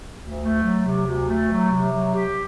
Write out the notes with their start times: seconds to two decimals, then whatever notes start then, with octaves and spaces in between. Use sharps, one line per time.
0.20 D2
0.42 A3
0.63 F#3
0.85 C3
1.06 D2
1.28 A3
1.50 F#3
1.71 C3
1.92 F#3
2.13 G4